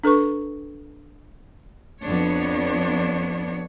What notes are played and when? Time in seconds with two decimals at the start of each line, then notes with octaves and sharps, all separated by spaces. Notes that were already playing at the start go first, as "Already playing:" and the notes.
0.04 D4 A4 B4 C#6
2.03 F2 B3 D4 C#5